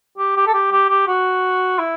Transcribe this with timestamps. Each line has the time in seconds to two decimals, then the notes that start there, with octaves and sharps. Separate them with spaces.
0.18 G4
0.36 G4
0.47 A4
0.54 G4
0.72 G4
0.89 G4
1.07 F#4
1.79 E4